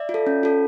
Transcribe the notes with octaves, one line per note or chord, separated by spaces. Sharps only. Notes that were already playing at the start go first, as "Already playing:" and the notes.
Already playing: D5 E5
F4
A4
C#4
F4 A4